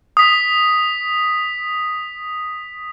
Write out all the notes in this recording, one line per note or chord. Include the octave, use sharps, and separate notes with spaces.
D#6 B6